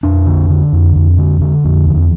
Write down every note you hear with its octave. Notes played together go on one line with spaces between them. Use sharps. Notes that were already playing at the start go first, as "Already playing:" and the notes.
F2 D4
D3
D3
F2
F2
D3
D3
F2
E2